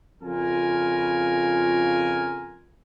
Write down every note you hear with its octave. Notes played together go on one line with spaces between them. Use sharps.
F2 C#3 F4 A#4 G#5